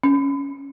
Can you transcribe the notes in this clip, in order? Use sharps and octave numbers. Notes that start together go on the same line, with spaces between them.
C#4